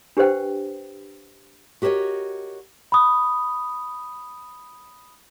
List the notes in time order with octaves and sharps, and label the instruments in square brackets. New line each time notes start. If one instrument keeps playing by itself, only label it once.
[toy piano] D4 G4 B4 C5 F#5 G5
[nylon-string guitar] F#4 G4 A#4 C5 C#5 D#5
[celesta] B5 D#6